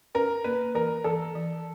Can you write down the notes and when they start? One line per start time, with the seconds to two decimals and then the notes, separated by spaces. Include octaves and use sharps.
0.15 C#4 A#4
0.44 A#3 B4
0.75 E3 A#4
1.04 E3 A4
1.35 E3